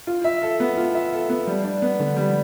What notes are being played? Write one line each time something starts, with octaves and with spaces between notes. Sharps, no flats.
F4
E5
A4
B3
F4
E5
A4
B3
G3
D4
B3
D3
G3